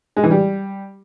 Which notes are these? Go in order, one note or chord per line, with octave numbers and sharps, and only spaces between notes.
G#3
E3
G3